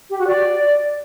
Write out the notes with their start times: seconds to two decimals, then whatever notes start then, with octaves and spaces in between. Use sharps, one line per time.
0.10 G4
0.19 F#4
0.27 D5